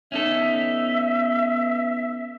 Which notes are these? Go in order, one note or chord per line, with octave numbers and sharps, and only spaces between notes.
B3 C#4 D#4 A4 E5